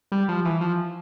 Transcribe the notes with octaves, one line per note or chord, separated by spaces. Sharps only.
G3
F3
E3
F3